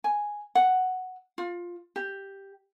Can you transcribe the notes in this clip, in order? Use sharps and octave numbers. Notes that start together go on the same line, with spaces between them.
G#5
F#5
F4
G4